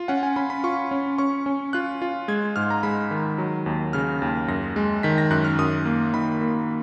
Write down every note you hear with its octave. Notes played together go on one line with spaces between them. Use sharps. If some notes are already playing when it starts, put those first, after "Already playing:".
Already playing: F4
C#4 F#5
G#5
C#4 B5
B5
F4 C#6
C#4
C#4 C#6
C#4
F4 F#6
F4
G#3 G#6
G#2 F6
A#5
G#3 B5
D#3
F#3
D#2
C#3 F6
D#2
F#2 A#6
G#3
D#3 B6
A#6
F#2 F#6
F6
F#2 D#6
A#3
D#3 B5
A#3